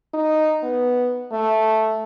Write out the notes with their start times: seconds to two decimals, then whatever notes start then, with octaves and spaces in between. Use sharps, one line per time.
0.14 D#4
0.63 B3
1.32 A3